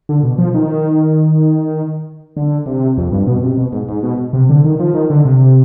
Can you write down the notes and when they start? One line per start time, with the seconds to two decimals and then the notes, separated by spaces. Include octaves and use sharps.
0.09 D3
0.23 B2
0.38 F3
0.54 D#3
2.37 D3
2.66 C3
2.98 F2
3.12 G2
3.27 B2
3.43 C3
3.58 B2
3.73 G#2
3.89 G#2
4.03 B2
4.33 C3
4.50 D3
4.64 D#3
4.80 F3
4.94 D#3
5.10 D3
5.25 C3